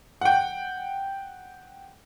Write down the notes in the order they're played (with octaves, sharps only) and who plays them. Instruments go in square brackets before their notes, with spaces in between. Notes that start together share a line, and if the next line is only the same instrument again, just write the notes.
[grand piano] F#5 G5